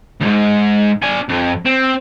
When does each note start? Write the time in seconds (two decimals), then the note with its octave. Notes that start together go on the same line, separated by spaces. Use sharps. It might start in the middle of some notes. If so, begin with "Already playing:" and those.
0.21 D2 G#2
1.03 D4 G#5
1.29 F2
1.66 C4